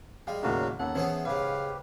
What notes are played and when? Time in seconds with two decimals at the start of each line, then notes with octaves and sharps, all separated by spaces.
0.27 G3 G#3 F5 G5
0.43 D#2 A2 C#3 A#3 F#4 F5
0.80 D#2 C#4 A4 F#5
0.95 E3 B3 C#4 G#4 C5 C#5
1.25 G#2 C#3 G4 B4 F5